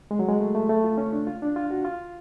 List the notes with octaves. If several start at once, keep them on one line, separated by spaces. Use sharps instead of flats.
G#3
F#3
G#3
A3
A3
A3
F4
C#4
D4
F4
D4
F4
F#4
F4